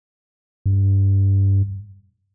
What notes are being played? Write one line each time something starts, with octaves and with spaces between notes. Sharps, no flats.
G2